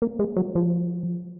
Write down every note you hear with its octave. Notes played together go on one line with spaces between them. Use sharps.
A#3
G#3
F#3
F3